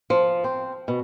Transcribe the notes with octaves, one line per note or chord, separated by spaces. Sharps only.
F3
C4
B2